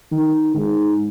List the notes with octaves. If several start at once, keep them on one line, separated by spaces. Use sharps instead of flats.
D#3
G#2